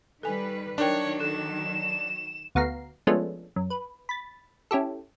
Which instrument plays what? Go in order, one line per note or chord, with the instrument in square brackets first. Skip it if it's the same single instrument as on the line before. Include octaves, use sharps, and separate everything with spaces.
[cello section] D#3 G3 B4 [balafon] A4 G#5
[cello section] D#3 F#3 [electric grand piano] D4 [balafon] D#4 A#4 G5 [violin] C#5
[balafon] A4 [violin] E7
[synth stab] D2 B3 F#4 F5 A#5 C7
F3 G#3 A3 B3 C#4 D4
F#2
B4
B5 A6
C#4 E4 G4 A4